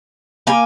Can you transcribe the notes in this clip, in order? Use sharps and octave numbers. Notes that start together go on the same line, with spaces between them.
G3 A#3 F5 G#5